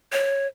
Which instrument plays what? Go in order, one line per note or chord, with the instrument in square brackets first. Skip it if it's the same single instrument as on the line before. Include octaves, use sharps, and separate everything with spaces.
[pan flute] C#5